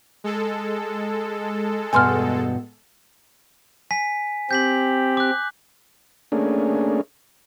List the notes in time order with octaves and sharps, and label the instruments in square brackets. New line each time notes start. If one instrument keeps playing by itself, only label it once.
[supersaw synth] G#3 A4
[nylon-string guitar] E2 G2 B2 [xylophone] G#5 C6 F6
[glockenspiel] G#5 B6
[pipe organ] C4 G4 [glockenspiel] G6 B6 F#7
[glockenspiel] D6 F#6
[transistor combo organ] A3 A#3 C#4 D4 G#4